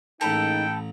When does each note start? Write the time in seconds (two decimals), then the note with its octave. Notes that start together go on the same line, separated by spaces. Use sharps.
0.21 A1 G#3 A#3 D#4 A4 G5 A#5 B5